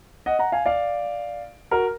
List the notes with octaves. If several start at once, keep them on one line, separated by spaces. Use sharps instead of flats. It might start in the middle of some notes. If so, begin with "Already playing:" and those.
D#5 F#5
F#5 A#5
F5 G#5
D5 F5
F#4 A#4